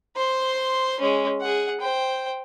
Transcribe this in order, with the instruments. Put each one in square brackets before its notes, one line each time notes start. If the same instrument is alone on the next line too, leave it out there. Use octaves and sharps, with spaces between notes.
[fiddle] C5 C6
G#3 C#4
G#4 F#5
C5 G5